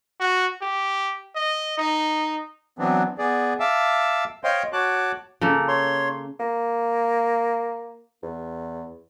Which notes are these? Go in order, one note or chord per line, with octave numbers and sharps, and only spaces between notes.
F#4
G4
D#5
D#4
E3 F#3 B3 C4 D4
B3 G#4 D5
E5 F5 A5 D6 E6
C5 C#5 D#5 F5 G5 C6
F#4 C#5 A5 D6 F#6
C#3 A#3 A4
C#5 C6
A#3
E2